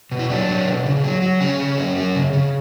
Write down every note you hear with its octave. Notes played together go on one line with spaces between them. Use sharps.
B2
E4
F#3 D4
F#3
B2
C#3
F#3
F#3
C#3 C#4
C#3
F#3
F#3
C#3
C#3